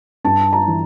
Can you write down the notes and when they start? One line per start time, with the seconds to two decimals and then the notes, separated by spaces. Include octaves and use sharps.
0.24 G2 A5
0.53 A#5
0.67 E3